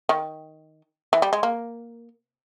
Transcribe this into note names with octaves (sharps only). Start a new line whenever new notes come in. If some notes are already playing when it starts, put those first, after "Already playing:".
D#3
E3
G3
G#3
A#3